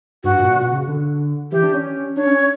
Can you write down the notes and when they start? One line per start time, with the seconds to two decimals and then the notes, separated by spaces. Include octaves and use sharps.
0.24 G2 F#4
0.39 A#2
0.56 B2
0.71 C#3
0.88 D3
1.52 E3 G4
1.63 D4
1.73 C#4
2.16 D4 C#5
2.26 C#4